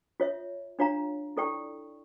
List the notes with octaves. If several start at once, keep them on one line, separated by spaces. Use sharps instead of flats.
F4 C#5 E5
D4 F4 C#5 F5 A#5
E4 A4 D5 G5 C#6